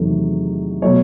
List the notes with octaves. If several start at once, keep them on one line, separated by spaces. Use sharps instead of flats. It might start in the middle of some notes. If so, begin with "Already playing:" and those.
Already playing: E2 C3 D#3 F#3 A3
B2 F#3 A3 C#5